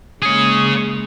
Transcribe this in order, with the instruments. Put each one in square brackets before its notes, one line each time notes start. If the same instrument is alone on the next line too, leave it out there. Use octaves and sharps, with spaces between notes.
[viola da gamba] C#3 G#3 A#3 [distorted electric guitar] G#4 C#5 [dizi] D#6